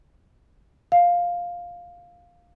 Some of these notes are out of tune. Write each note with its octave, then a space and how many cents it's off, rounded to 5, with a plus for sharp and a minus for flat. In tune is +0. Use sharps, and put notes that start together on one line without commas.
F5 +5